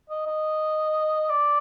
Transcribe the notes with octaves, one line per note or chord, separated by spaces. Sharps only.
D#5
D#5
D5